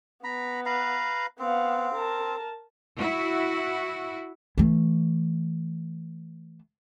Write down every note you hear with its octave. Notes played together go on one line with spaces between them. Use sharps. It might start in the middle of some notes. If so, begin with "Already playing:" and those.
B3 A#5 B5
B4 F5 A#5
B3 C4 F5
A#4 A5
E4 F#4
E3 A3